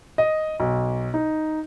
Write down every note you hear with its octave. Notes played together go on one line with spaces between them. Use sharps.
D#5
B1
D#4